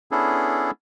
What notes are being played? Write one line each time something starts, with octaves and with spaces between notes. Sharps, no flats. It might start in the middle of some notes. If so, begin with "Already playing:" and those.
B3 C#4 D4 E4 G#4 A4